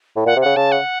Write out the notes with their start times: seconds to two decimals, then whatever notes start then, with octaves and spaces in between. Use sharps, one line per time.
0.16 A2
0.26 A#2 F#5
0.36 C3
0.41 C#3 F#5
0.56 C#3 A5
0.72 F#5